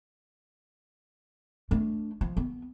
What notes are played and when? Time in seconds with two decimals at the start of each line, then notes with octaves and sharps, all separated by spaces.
1.71 A3 D4
2.21 F3
2.37 B3